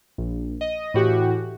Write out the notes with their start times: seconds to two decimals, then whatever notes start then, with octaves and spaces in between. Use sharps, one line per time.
0.18 A#1
0.61 D#5
0.94 A2 E3 F#4 G4